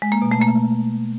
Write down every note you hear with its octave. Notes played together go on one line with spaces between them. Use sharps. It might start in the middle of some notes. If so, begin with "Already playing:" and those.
G#3
A#3
B2
A3
A#3